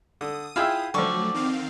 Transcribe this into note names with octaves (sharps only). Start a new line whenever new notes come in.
D3 D#6
E4 F4 G#4 E5 F5 G5
D3 F3 F#3 A3 D5 C#6
D#3 C4 F5